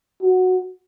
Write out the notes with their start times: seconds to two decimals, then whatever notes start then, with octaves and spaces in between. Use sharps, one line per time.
0.22 F#4